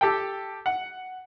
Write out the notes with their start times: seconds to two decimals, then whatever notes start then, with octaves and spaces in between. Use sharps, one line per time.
0.01 G4 A4 G5
0.66 F#5